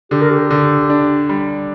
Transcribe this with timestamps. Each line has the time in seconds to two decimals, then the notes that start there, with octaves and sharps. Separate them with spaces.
0.11 D3 G4
0.21 A#4
0.30 G4
0.51 D3
0.90 D4
1.29 G3